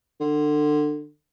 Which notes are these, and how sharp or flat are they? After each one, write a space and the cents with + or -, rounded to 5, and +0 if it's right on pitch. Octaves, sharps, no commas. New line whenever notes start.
D3 +25